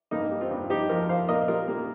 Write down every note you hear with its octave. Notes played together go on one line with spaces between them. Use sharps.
G2 A#3 D#4
G3
C4 F4
G2
F3 D#4 G4
F2 F4 A#4
F2 C5 F5
A#2 A#4 D#5
G3 F4 A#4
G3 A#3